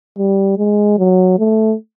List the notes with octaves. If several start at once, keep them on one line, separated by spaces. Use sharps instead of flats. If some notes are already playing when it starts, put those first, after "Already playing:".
G3
G#3
F#3
A3